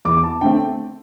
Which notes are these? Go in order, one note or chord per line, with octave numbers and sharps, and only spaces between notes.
E2 D6
A5
D3 A3 C4 G5